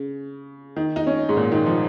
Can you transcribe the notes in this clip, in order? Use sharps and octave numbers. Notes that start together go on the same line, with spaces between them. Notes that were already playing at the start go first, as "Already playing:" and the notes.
Already playing: C#3
D#3
D#4
C#4
G#2
A#2
D#3
F3